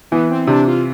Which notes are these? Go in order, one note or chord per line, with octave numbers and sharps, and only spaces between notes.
E3 B3
C4
C3 D4
F4